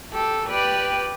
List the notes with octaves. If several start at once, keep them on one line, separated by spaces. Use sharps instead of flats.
G4 A4
G4 B4 D5